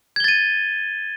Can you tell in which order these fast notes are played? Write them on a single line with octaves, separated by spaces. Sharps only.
G#6 G7 A6 D#7